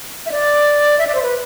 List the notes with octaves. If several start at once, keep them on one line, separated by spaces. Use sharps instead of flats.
E5
D5
E5
D5
C5
B4